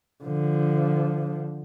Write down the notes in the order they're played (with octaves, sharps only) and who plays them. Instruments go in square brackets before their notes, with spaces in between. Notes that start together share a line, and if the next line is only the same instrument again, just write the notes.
[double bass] D3 F3